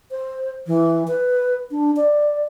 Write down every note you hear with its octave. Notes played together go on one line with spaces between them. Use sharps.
C5
E3
B4
D4
D5